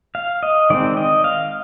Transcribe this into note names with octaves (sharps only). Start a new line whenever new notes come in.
F5
D#5
D#3 G#3 C4 D5
D#5
F5